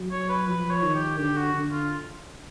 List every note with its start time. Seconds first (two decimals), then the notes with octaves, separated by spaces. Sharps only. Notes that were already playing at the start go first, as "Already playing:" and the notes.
Already playing: F#3
0.11 C#5
0.29 B4
0.47 F3 B4
0.70 C#5
0.83 D#3
0.94 G4
1.18 D3 G4
1.36 F#4
1.54 D3
1.72 F4